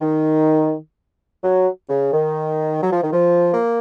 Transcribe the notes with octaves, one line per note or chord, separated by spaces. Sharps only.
D#3
F#3
C#3
D#3
F#3
F3
D#3
F3
A#3